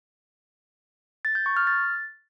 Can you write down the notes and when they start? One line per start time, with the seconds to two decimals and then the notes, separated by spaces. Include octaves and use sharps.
1.25 A6
1.35 G6
1.46 C#6
1.57 F6
1.67 A6